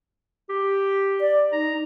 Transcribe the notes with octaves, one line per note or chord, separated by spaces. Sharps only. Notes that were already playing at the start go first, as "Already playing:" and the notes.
G4
D5
D#4 A#5